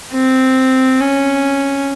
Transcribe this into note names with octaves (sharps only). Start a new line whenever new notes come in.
C4
C#4